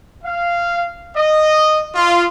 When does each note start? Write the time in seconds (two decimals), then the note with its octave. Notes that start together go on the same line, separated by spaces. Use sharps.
0.23 F5
1.14 D#5
1.95 F4